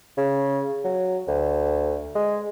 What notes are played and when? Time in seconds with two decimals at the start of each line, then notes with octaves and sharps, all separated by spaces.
0.18 C#3
0.84 F#3
1.28 D2
2.15 G#3